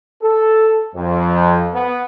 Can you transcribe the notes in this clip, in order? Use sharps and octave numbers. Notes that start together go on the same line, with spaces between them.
A4
F2
B3